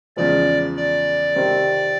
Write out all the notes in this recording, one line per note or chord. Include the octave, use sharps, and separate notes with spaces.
E2 C#3 F3 G#3 D5
D5
C3 D#3 G3 C4